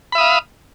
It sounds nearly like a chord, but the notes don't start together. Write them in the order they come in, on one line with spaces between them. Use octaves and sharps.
B5 E5 D#6 F5